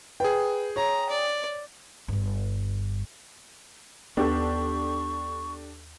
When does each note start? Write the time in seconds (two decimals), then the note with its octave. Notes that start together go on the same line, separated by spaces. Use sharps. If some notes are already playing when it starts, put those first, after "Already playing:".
0.20 G#4 B4 G5
0.76 C#5 A#5
1.10 D5
2.08 G1 G2
4.17 D#2 B3 D4 G4 A4 C#6